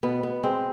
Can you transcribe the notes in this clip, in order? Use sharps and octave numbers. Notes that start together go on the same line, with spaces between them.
B2 B3
B3
G#3 C4